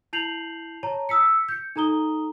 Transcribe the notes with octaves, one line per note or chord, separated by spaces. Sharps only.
E4 A5 G6 C7 F7 F#7
C#5 A5 A#5
D#6 E6 B6 C#7
G6 C#7
D#4 A4 A#5 D#6 G7